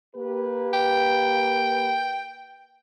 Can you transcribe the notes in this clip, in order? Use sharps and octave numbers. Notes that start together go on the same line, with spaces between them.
A#3 G4 B4
G5